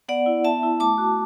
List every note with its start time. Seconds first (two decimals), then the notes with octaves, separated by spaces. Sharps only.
0.08 B3 D5 F#5
0.26 E4
0.45 B3 E5 A5
0.63 E4
0.80 A3 A5 D6
0.98 F#4